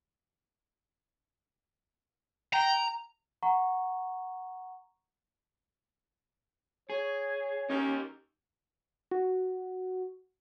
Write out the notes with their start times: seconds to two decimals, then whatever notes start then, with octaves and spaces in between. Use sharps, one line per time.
2.54 G5 A#5
3.43 F#5 A#5 C#6
6.90 G#4 C#5
7.70 C#4 D#4 G4 A#4
9.11 F#4